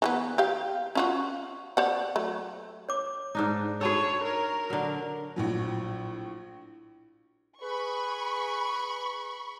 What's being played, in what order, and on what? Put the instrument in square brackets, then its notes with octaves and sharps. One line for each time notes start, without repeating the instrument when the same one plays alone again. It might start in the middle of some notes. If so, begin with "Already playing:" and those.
[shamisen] E3 A3 B3
G4 F5
C#4 F4 F#4
C5 D5 F#5
F#3 A3
[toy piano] C#5 D6
[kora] G#2 D4 D#4
[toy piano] F#4 A5 E6 [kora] G#4 A4 [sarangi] C#5
[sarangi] A#4
[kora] D3 F#3
[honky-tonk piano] A#1 A2 F#3
[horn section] G#4 B4 [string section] B5 C#6